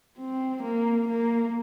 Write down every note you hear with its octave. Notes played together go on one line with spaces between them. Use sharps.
C4
A#3
A#3